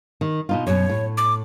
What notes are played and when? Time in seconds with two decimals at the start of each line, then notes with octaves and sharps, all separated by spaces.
0.21 D#3
0.49 B2 D#4 F4
0.67 F#2 B2 C#5
0.90 A2
1.17 D6